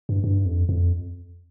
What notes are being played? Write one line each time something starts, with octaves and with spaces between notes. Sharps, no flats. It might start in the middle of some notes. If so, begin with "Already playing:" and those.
G2
G2
F2
F2